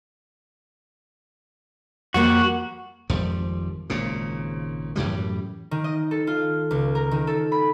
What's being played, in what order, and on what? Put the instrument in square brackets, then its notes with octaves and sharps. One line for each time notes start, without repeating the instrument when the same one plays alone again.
[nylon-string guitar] F2 G3 A#3 [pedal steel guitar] F#4
[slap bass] G#1 F2 F3 G3
G#1 A#2 C#3
F#2 A2 E3 G3
[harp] D#3
D#5
A4
F4
C#2
A#4
D#3
A4
B5